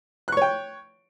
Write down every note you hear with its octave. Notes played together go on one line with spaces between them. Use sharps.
C#5 G5 C#6 F#6